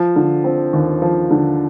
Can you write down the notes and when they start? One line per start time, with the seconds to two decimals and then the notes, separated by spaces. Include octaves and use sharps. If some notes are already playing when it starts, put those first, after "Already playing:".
Already playing: F3
0.16 D3
0.44 C4
0.73 D#2
1.02 F3
1.31 D3